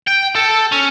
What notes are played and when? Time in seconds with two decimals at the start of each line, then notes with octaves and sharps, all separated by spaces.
0.08 G5
0.36 A4
0.72 C#4